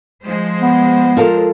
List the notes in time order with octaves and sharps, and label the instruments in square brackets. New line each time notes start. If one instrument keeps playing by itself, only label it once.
[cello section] F3 G#3 C5
[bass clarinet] B3
[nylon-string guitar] F4 A4 A#4